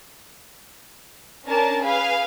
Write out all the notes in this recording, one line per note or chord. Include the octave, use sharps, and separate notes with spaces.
C#4 D4 A#4 G#5 A5
G#4 B4 F5 G#5